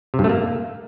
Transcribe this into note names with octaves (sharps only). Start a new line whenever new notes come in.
C3
G2
A3
A#3